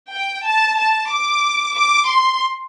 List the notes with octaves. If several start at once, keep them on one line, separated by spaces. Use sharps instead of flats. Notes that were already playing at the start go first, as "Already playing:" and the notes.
G5
A5
A5
D6
D6
C6